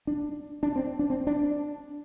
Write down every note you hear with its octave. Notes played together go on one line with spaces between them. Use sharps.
D4
D4
C4
D4
C4
D4